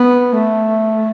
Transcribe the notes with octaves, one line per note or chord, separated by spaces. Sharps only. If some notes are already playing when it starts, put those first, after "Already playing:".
Already playing: B3
A3